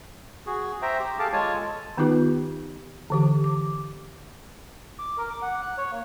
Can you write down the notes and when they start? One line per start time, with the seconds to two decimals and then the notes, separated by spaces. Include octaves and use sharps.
0.46 F#4 G#4
0.82 C5 E5 G5 A#5
1.00 G4
1.19 G#4 A4 F5 A5 D6
1.33 G#3 F4 C#5 G#5 A5
1.55 A4
1.97 D#3 B3 D#4 F4 G4 B4
3.10 D3 E3 G4
3.44 D6
4.99 D6
5.18 A#4
5.29 D6
5.42 F#5
5.62 F#6
5.78 C#5
5.91 A#3